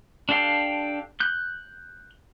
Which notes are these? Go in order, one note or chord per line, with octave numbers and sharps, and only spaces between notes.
D4 G4 A4 F5 G5
F#6 G6